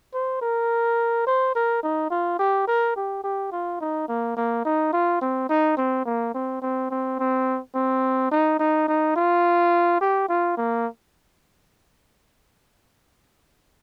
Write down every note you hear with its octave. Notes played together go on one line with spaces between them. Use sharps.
C5
A#4
C5
A#4
D#4
F4
G4
A#4
G4
G4
F4
D#4
A#3
A#3
D#4
F4
C4
D#4
C4
A#3
C4
C4
C4
C4
C4
D#4
D#4
D#4
F4
G4
F4
A#3